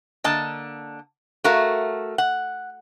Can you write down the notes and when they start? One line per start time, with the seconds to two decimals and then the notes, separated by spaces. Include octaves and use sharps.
0.24 D3 A#3 D#5 A5
1.44 A3 F#4 A#4 F5
2.18 F#5